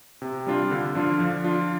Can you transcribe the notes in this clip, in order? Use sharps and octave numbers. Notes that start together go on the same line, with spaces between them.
C3
G3 D4 F4
D3
F3 D4 F4
F3
D4 F4